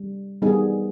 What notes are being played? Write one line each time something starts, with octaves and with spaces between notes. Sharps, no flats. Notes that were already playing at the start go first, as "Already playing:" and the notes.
Already playing: G3
G3 B3 D#4 G#4